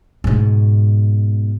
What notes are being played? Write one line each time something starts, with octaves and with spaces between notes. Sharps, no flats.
G#2 B2